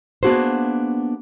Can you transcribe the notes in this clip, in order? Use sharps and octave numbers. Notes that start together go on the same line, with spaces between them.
A#3 B3 D4 F#4 G#4 C5